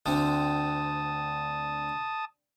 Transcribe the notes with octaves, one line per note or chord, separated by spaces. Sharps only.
D2 D3 C4 A5 D#6